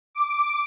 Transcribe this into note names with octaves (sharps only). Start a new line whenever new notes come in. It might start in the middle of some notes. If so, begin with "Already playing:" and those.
D6